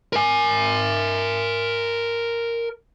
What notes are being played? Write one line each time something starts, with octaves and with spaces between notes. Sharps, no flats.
A#4 G#5